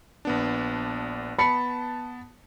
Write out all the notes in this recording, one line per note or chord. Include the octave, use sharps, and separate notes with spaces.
A#1 B3 D4
B3 A5 B5 C#7